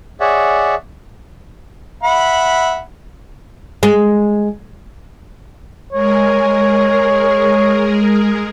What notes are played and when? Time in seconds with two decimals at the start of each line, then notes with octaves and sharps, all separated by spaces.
0.20 G#4 C#5 D5 E5 F#5
2.03 E5 F#5 B5
3.83 G#3
5.93 G#3 G#4 A#4 C#5